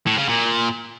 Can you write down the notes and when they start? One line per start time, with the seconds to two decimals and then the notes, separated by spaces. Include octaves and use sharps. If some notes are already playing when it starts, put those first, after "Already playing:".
0.07 A2
0.18 C#3
0.29 A#2